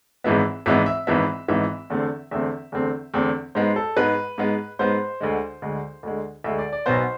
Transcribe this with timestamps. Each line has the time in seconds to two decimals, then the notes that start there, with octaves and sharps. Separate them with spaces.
0.24 G#1 G#2 E3 G#3 B3 E5
0.66 G#1 G#2 E3 G#3 B3 E5
0.86 E5
1.07 G#1 G#2 E3 G#3 B3 E5
1.48 G#1 G#2 E3 G#3 B3 E5
1.90 E2 D3 A3 C4
2.31 E2 D3 A3 C4 E5
2.72 E2 D3 A3 C4
3.14 E2 D3 A3 C4
3.55 G#2 G#3 B3 C5
3.76 A4
3.96 G#2 G#3 B3 B4
4.38 G#2 G#3 B3
4.79 G#2 G#3 B3 C5
5.21 D2 D3 G#3
5.62 D2 D3 G#3
6.03 D2 D3 G#3
6.44 D2 D3 G#3 E5
6.59 D5
6.72 D5
6.86 B1 B2 B3 C5